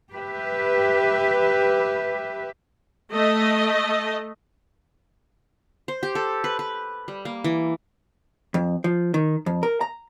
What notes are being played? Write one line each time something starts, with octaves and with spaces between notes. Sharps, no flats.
G4 B4 E5
A3 D#5
C5
G4
A4
B4
B4
G3
A#3
E3
F2
F3
D#3
F2
A#4
A#5